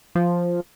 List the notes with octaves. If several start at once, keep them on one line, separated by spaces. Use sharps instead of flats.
F3